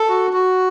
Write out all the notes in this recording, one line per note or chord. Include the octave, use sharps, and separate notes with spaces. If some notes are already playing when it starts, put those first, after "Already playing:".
Already playing: A4
F#4
F#4